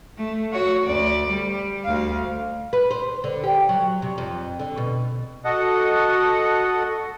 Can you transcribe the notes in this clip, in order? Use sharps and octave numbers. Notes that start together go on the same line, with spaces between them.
A3
F#4 C#5
D2 D5
G3
D2 F5
B4
C5
D3
G4
F#3
C3
F2
D3
B2
F#4 A4 D#5 F#5